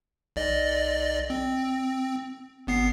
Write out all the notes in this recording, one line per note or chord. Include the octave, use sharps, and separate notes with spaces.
B1 D5 D#5
C4
G#1 B3 C7